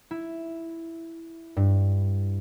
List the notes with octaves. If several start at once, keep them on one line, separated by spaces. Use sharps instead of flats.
E4
G2